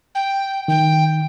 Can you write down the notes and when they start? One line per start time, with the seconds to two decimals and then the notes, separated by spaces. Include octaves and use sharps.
0.14 G5
0.68 D#3 G5